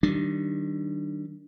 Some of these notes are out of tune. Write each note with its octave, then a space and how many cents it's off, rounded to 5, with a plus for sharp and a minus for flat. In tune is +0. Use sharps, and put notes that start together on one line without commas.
D#3 +0 G3 -30 D4 +0